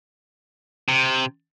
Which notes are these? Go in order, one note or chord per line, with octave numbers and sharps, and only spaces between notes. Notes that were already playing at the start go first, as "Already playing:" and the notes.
C3